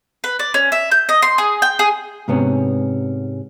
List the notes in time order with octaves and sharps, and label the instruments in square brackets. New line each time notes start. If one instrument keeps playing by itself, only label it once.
[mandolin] B4
D5
C#4
E5
G6
D#5
C6
G#4
G5
G#4
[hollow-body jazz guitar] G#2 C3 B3 C#4